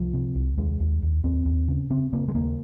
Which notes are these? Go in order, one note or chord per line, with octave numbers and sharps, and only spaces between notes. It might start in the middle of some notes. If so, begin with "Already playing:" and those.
Already playing: C2 F3
C3
C2
D#2 G#3
D#2
D#2
D#2 C4
D#2
C#3
C#3 C4
C#3 A#3
G#3
D#2 A#3